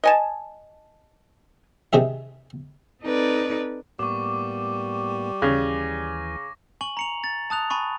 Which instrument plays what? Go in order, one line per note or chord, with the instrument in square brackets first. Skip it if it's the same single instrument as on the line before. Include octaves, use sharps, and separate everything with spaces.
[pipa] D#5 G#5 A5
[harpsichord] C3 D#3 G#4 E5
[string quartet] C4 D#4 A4 B4 D5
[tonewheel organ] A2 A#3 B3 [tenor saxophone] G3 [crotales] C#6 D6
[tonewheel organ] D#2 E3 G#5 [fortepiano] C#3 [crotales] A#6
[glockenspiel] G#5 C#6 F#7
A#5 C#7 F7
A6
A5 D#6 F#6 F7
G#5 B5 C#6